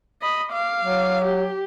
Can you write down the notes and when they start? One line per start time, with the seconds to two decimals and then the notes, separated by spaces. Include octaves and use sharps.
0.22 D#5 B5
0.52 F5 D6
0.83 F#3
1.25 G4